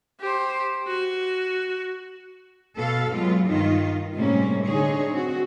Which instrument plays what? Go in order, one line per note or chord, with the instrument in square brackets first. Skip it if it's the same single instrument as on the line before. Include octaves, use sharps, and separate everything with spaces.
[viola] G4 C5
F#4
[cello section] B2 A4 F5
F#3 G#3 B3 F4
G2 D#3 D#4 F4
A2 C3 G3 G#3 A#3 C#4
D3 D#4 G#4 C#5
C4 F#4